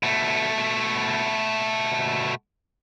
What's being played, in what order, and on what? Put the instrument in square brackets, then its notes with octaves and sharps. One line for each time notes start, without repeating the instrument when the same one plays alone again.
[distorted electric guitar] B2 A3